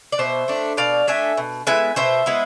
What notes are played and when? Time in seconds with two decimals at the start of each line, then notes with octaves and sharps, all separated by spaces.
0.12 D5
0.19 B2 C5 E5
0.48 A3 D4
0.77 B2 D5 F5
1.07 A3 D4 E5 G#5
1.37 B2
1.67 G#3 B3 E4 E5 G#5
1.96 B2 C5 E5
2.26 G#3 B3 E4